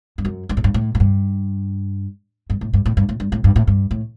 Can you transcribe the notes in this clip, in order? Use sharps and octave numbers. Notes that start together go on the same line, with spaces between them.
G2
F#2
G2
A2
G2
A2
A2
G2
G2
A2
G2
A2
G2
A2
G2
A2
G2
A2
G2
A2